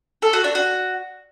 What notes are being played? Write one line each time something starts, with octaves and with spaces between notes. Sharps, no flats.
A4
F#4
D4
F#4